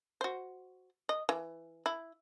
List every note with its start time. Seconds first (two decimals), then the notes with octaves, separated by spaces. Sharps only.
0.21 F#4 C5
1.09 D#5
1.29 E3
1.86 E4